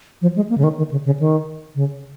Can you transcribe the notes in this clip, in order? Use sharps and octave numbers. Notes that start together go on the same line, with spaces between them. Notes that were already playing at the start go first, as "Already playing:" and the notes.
F3
G#3
A#3
C#3
D#3
D#3
C#3
C#3
D#3
C#3